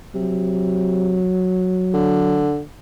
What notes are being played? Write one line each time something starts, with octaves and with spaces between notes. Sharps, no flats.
C3 F#3
D3